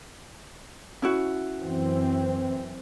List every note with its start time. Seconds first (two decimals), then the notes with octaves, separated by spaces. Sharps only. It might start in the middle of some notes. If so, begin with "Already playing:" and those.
1.02 C#4 E4 F#4
1.61 F#2 E3 C4